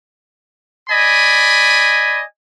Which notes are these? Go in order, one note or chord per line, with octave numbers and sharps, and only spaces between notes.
D5 D#5 G#5 B5